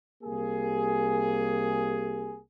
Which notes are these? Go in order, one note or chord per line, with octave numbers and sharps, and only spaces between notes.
C2 A#3 G4 G#4